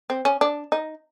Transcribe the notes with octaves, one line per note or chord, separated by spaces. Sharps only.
C4
C#4
D4
D#4